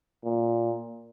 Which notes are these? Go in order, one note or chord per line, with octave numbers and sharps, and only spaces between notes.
A#2